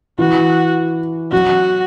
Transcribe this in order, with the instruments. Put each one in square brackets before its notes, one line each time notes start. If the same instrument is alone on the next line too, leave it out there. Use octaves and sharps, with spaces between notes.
[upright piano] E3 [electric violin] F#4
[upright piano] F#3 [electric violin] F#4